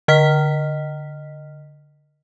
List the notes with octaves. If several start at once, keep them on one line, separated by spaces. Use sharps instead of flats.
D3 D#5 F6 B6